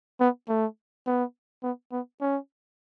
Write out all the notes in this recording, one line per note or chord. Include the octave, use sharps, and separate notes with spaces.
B3
A3
B3
B3
B3
C#4